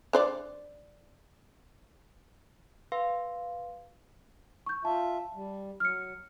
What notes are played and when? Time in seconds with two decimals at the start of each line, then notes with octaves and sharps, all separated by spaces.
0.13 D4 C5 D5
2.92 B4 F5 C6
4.66 C#6 G6
4.85 F4 E5 A5
5.35 G3
5.80 F#3 F6 C#7